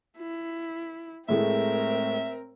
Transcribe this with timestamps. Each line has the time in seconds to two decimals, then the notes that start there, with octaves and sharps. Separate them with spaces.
0.18 E4
1.29 A2 G#3 A3 C4 A#4 E5